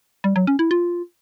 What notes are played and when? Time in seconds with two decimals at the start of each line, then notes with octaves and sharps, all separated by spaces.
0.24 G3
0.36 F#3
0.47 C#4
0.59 E4
0.71 F4